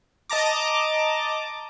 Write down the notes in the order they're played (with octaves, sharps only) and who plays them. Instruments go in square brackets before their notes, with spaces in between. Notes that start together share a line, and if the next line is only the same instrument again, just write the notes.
[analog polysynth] D#5 A5 A#5 D6